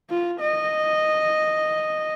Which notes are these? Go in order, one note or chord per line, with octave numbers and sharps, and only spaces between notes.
F4
D#5